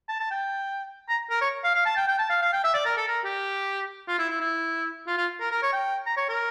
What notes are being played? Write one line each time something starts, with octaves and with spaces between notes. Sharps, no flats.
A5
A5
G5
A#5
A#4
C#5
F5
F5
A5
G5
G5
A5
F5
F5
G5
E5
D5
A#4
A4
A#4
G4
F4
E4
E4
E4
F4
F4
A#4
A#4
C#5
G5
A#5
C#5
A#4